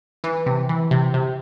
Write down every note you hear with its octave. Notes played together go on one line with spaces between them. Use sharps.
E3
C3
E3
C3
C3